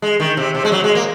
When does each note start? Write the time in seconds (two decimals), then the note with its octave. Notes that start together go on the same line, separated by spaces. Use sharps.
0.02 G#3
0.20 D#3
0.37 C3
0.55 C3
0.65 G#3
0.72 F#3
0.84 G#3
0.95 A#3